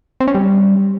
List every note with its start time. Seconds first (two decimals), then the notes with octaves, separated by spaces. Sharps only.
0.20 C4
0.28 C#4
0.35 G3